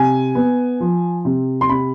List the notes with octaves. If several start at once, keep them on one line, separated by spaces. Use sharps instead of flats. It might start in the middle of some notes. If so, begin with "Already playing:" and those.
Already playing: C3 G#5
B3
F3
C3
C6
C3 B5